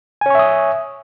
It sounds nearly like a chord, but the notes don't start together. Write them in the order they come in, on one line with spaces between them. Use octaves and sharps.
G#5 C#5 C#6 E5 D#6